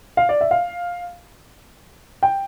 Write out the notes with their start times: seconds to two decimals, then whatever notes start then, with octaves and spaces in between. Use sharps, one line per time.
0.17 F5
0.29 D5
0.41 E5
0.51 F5
2.23 G5